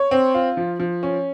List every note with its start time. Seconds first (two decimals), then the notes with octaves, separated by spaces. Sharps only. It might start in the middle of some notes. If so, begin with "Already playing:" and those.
Already playing: C#5
0.11 C4
0.35 F4
0.57 F3
0.80 F3
1.03 C#4